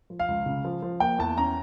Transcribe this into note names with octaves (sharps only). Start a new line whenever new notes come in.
F3
F5
C#2
C#3
F3
F3
A#3 G5
E2 A5
C#4 A#5